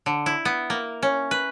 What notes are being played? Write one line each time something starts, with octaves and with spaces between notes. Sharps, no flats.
D3
E4
B3
A#3
C#4
B4